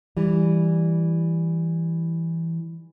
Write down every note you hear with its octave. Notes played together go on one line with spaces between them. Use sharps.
E3 G3